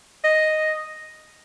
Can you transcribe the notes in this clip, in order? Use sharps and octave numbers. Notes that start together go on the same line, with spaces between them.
D#5